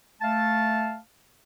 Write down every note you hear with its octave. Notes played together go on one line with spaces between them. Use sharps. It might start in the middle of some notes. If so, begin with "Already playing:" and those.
A3 F5 A5